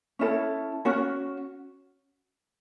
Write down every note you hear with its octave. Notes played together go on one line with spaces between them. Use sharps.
C#4 E4 A4
C#4 F#4 C#5